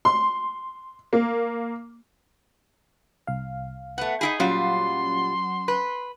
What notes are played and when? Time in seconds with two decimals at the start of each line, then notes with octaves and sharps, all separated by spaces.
0.05 C6
1.13 A#3
3.27 C2 F5
3.98 A3 B3 F#5
4.21 D#4 E4 G#4 B5
4.40 A#2 F#3 G3 C#4 F4 F#5 C6
5.68 B4